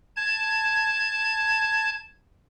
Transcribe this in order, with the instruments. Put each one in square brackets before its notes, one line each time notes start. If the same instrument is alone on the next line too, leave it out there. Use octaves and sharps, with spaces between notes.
[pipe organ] A5 G#6